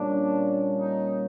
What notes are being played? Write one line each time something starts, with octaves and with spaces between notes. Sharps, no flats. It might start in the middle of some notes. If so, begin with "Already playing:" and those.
Already playing: A#2 G3 A#3 C#4 D4
D#4